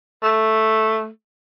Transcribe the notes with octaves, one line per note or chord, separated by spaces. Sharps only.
A3